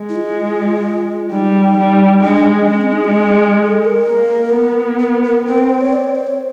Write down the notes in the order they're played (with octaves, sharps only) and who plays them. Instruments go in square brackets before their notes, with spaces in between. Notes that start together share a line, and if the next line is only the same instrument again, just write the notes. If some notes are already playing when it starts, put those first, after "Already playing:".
Already playing: [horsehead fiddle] G#3
[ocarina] E4
F4
[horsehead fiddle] G3 [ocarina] D#4
[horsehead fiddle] G3
[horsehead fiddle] G#3 [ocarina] D4
[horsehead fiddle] G#3 [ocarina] C#4
[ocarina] C4
D#4
G#4
A4
A#4
[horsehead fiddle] A#3
B3
[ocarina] A#4
A#4
[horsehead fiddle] C4 [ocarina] A#4
[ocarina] B4
C5
C#5
D5
C#5
C5
C#5